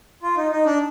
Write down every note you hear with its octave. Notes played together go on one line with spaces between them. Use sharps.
F4
D#4
D#4
D4